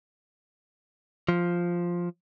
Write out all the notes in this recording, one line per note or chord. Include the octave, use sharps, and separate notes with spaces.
F3